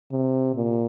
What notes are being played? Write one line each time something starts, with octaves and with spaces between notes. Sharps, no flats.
C3
A#2